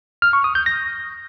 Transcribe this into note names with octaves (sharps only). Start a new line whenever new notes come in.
F6
C#6
D#6
G6
A#6